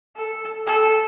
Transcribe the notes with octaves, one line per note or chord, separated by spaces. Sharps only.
A4
A4